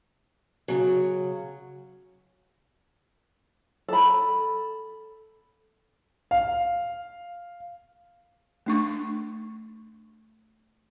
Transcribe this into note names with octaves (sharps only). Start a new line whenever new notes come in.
C#3 F#3
A4 B5
F5
A3 D4 C#6